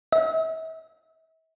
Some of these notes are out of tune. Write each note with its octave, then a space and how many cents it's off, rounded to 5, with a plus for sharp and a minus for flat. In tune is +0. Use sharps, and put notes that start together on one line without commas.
E5 -40